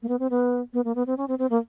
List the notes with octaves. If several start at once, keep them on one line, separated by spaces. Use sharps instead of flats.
A#3
B3
C4
B3
B3
A#3
B3
C4
C#4
C4
C4
A#3